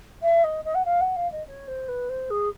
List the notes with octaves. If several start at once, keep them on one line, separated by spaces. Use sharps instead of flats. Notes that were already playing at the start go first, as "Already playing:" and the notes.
E5
D#5
D#5
F#5
F5
F#5
F5
D#5
C#5
C5
B4
C5
G#4